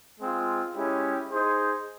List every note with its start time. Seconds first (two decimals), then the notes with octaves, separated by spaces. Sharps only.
0.20 G#3 C4 F4
0.75 G#3 C#4 E4 G4
1.30 D#4 G#4 C5